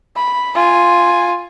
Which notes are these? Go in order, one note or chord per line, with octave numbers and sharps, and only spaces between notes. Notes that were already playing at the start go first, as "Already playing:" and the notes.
B5
F4 G#5